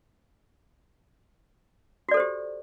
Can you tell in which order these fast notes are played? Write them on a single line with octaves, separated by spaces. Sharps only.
F#4 D5 A4 C5 G4